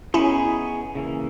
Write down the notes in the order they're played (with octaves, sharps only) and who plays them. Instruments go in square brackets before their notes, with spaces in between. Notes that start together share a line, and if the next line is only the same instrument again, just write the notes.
[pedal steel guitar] B3 D#4 G#4 C#5 [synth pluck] C#4 E4
[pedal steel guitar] C#3 E3 A#3